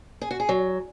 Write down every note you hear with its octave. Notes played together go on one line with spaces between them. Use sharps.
G#4
F#4
G#4
F#3